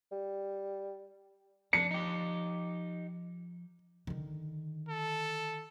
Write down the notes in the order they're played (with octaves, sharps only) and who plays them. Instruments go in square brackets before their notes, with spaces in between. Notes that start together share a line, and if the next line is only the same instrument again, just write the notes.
[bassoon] G3
[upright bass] F3 [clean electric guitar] D4 [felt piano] C#7
[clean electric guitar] D#4 G4
[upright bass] D3 D#3
[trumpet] A4